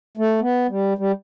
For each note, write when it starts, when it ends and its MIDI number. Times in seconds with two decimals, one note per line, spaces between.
0.17 0.40 57
0.41 0.67 59
0.69 0.93 55
0.98 1.12 55